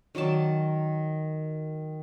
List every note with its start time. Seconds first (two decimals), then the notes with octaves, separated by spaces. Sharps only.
0.15 D#3 F#3 D5 A5